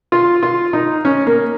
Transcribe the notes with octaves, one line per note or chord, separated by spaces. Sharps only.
F4
F4
D#4
C#4
A#3